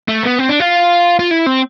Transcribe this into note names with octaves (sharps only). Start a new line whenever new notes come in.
A3
B3
C4
D4
F4
F4
E4
C4